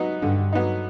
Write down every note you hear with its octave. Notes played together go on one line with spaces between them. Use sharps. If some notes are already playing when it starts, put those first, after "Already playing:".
Already playing: F#3 B3 D#4
G2 D3
F#3 B3 D#4